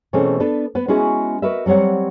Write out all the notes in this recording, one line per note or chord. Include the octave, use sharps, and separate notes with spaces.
B2 E3 A3 C4 C#4 G#4
B3 D4 A4 B4
B3 B4
G#3 B3 C#4 E4 F#4 G#4
F#4 A#4 B4 D#5 E5
F#3 G3 C4 C#5 F#5